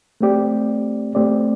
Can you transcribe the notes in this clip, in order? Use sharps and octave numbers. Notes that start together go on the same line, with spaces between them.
A3 C4 G4 D5
A3 C4 G4 D5